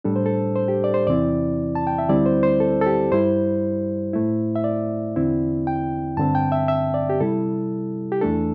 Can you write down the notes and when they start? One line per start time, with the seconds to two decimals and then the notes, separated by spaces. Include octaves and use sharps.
0.04 A2 G3 D4 A4
0.16 C5
0.26 A4
0.56 C5
0.68 G4
0.84 D5
0.94 C5
1.07 E2 C3 E3 C4 E4 D5
1.75 A5
1.87 G5
1.98 E5
2.09 D2 D3 G3 C4 E4 D5
2.26 C5
2.43 C5
2.60 A4
2.81 A4
2.86 G4
3.12 G2 G3 E4 C5
4.13 A2 A3 E4
4.56 E5
4.64 D5
5.16 E2 D3 C4 E4
5.67 G5
6.17 G2 D3 C4 A5
6.35 G5
6.52 E5
6.68 E5
6.94 D5
7.10 G4
7.20 C3 G3 E4 A4
8.12 G4
8.21 E2 E3 A3 D4 A4